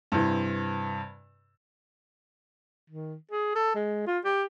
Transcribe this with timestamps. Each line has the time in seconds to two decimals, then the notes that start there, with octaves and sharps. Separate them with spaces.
0.12 G2 C3 E3
2.90 D#3
3.31 G#4
3.55 A4
3.75 G#3
4.07 F4
4.25 G4